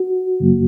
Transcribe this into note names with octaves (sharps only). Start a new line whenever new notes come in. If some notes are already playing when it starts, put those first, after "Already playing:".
Already playing: F#4
F#2 C#3 F#3 A#3